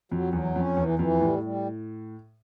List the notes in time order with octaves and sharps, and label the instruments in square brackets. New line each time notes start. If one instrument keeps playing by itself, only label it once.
[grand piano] F2 [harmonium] F#3
[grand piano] E2 [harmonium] F#3
[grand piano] F2 [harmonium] C#4
[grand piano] E2 [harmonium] E3
[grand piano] F2 [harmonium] E3
[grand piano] A2 [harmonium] G3
[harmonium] G3